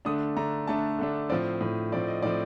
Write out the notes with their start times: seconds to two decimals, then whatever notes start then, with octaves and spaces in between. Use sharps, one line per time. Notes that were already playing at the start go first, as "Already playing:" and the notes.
0.05 D3 A3 D4 D#6
0.37 D3 A3 D4 A#5
0.67 D3 A3 D4 A5
0.99 D3 A3 D4
1.30 A2 F3 C4 D5
1.61 A2 F3 C4
1.92 A2 F3 C4 D5
2.08 D#5
2.23 A2 F3 C4 D5